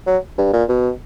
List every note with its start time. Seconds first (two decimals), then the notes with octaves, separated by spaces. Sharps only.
0.07 F#3
0.38 G2
0.53 A#2
0.69 B2